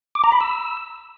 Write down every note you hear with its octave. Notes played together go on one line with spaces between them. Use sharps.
D6
A#5
B5
E6